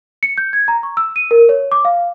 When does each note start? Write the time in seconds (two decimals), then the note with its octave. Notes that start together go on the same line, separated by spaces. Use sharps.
0.23 C#7
0.38 G6
0.53 G#6
0.68 A#5
0.83 C#6
0.97 E6
1.16 D#7
1.31 A#4
1.49 C#5
1.72 D6
1.85 F5